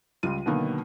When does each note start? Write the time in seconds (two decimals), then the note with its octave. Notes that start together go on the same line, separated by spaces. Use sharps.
0.23 C#2 G3 F4 D#7
0.46 B2 D3 D#3 F#3 A#3 B3